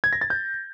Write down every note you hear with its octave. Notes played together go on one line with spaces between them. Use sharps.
G#6
A#6
A6
G6